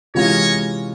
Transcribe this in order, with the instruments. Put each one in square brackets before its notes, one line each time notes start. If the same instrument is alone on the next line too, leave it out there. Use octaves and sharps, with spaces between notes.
[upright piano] C3 E3 G#3 C#4 F4 [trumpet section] C#5 D#5